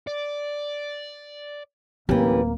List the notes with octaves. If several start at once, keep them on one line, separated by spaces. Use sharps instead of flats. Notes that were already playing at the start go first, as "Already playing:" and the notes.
D5
D1 E3 A#3 C#4 G4